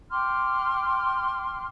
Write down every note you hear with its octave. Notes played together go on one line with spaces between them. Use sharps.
G5 C6 D6 F6